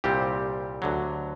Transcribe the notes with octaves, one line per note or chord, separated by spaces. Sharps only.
C2 A#2 G3 C4 G4
D2 D3 F#3